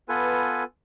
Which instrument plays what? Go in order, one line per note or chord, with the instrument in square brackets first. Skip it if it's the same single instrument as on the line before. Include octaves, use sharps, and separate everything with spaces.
[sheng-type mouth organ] B3 F4 A4 B4 G#5